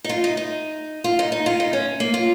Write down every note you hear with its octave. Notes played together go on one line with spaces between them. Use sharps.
D#4
F4
D#4
D#4
F4
D#4
D#4
F4
D#4
C#4
A#3
F4